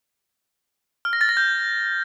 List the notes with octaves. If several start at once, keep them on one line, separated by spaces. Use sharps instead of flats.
F6
A#6
A6
A#6
G6